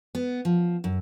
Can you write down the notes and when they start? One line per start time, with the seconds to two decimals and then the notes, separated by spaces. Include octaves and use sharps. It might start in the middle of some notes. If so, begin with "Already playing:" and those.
0.15 B3
0.45 F3
0.84 F#2